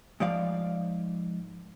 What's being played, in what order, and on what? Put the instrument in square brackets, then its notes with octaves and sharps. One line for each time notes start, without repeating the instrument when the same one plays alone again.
[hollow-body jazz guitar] G#2 F3 D5 F5